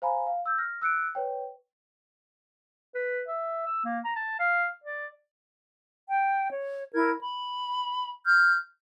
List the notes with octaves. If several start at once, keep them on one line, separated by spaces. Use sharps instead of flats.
C5 F5 G#5 A#5 B5
F5
E6 G6
F6 A#6
E6 F#6 C#7 D7
B4 C#5 G5
B4
E5
E6
A#3
A#5
A5
F5
D5
G5
C#5
E4 A#4 G#6
B5
F6 G6